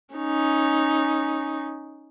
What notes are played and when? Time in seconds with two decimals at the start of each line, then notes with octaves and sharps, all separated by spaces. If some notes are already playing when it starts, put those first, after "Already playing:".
0.15 C#4 D#4